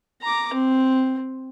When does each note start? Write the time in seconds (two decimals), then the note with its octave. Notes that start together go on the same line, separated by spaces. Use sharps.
0.22 A#5 D6
0.53 C4